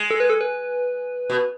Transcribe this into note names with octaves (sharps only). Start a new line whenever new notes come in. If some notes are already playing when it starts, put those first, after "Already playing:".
Already playing: G#3
A4
B4
A4
B4
B2